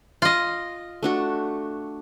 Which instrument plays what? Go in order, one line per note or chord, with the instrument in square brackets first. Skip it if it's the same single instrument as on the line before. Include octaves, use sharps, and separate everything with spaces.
[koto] F4 D#5
[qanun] A3 D4 F#4